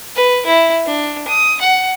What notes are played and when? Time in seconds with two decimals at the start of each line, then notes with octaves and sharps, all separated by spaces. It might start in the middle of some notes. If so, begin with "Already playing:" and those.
0.16 B4
0.46 E4
0.86 D4
1.28 D#6
1.61 F#5